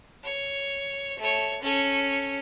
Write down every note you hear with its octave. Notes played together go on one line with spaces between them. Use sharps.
C#5
A3 C#5
C#4 A4